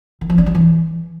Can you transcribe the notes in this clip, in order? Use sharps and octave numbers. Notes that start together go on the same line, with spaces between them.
D#3
F3
D4
G3
E3